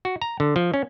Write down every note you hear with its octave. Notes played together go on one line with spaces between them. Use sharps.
F#4
A#5
D3
F3
C#4